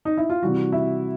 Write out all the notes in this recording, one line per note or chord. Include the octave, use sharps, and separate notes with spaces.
D#4
E4
F4
C3 E3 G3 F#4
E4